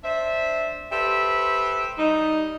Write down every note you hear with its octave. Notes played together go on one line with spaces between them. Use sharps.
D4 C5 E5
G4 A4 B4 C5 E5
G3 D#4